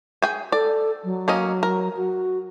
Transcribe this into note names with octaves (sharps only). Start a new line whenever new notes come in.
G#4 G5 G#5
A4 D5
F#3
A#3 C#4 D#5
A#4
F#4